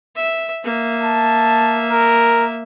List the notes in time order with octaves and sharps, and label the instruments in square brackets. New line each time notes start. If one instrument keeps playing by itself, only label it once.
[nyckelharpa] E5
A#3 E5
[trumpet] A5
A#4